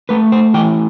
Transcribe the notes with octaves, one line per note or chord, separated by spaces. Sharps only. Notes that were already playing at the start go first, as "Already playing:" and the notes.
A3 B4
C5
E3 G5